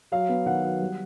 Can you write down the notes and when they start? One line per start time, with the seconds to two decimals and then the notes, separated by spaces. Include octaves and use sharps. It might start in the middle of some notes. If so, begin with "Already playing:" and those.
0.12 F#3 F5
0.29 B3
0.46 D#3 F#5
0.64 F#3
0.80 G3